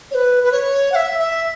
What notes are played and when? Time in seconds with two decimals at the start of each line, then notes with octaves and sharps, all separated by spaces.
0.10 C#5
0.14 B4
0.43 B4
0.51 C#5
0.91 F#5
0.94 E5
1.18 E5